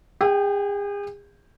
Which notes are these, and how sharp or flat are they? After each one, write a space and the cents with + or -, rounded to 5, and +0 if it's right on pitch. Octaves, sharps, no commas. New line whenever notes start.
G#4 -40 G5 -10